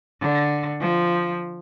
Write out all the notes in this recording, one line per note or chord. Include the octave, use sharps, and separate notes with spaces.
D3
F3